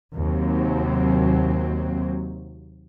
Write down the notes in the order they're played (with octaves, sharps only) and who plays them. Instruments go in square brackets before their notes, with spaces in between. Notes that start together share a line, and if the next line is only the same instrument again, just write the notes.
[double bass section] D#2 C3 F#3 C4